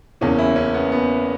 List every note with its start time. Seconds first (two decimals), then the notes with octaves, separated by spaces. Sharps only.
0.21 F#1 E2 E3 C#4
0.39 E4
0.56 C#4
0.74 B3
0.92 B3